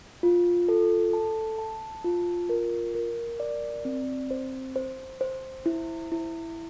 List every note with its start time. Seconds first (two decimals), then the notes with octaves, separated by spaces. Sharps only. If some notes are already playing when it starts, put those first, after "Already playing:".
0.23 F4
0.68 A4
1.13 A5
1.59 A5
2.04 F4
2.49 A#4
2.95 A#4
3.40 D5
3.85 C4
4.31 C5
4.76 C5
5.21 C5
5.66 E4
6.12 E4